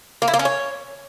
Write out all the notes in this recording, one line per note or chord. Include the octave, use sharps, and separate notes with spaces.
A#3
E4
A#3
C#4
C#5